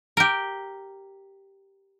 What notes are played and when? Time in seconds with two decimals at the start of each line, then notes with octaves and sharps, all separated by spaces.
0.17 G4 A#4